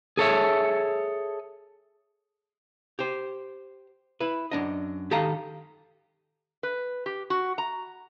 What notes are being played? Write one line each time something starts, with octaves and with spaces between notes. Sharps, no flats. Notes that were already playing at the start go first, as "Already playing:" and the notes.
G#4 A4 C#5 E5
G4 C5
E4 B4
F#2 D4 D#5
D#3 G4 A4 D#5 F5 A#5
B4
G4
F#4
A#5